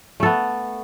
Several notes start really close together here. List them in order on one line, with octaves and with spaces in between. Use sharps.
A3 A4 B3